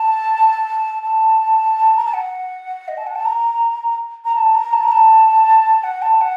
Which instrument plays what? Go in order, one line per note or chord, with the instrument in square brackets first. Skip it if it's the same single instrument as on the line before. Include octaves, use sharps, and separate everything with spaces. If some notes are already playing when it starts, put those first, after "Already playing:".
Already playing: [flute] A5
A5
A#5
A5
F#5
D#5
A5
F#5
A5
A#5
A#5
A5
A#5
A5
A#5
A5
F#5
A5
F#5